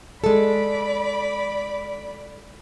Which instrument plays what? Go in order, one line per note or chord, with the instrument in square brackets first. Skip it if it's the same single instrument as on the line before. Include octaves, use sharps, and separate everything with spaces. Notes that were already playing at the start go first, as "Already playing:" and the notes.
[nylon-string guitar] G#3 A4 [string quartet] D5 B5